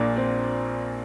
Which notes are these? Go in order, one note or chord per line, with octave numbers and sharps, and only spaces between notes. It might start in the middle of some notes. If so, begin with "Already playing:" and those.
Already playing: A#1 A#2 A#3 D4
C4